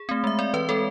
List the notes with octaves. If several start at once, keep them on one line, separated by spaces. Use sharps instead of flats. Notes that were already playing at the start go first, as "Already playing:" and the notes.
Already playing: G#4
A3 C4
G#3 E5
C4 D5
E3 B4
G#3 C4 A4